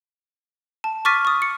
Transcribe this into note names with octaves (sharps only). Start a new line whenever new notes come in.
A5
C#6 D6 F6 A6 B6 D#7
C#6 D#6
C#7